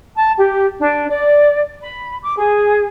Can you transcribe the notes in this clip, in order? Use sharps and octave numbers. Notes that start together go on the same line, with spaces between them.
A5
G4
D4
D5
B5
D6
G#4